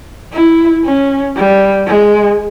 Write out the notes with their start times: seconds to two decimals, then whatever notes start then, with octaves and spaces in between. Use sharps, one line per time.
0.33 E4
0.85 C#4
1.37 G3
1.87 G#3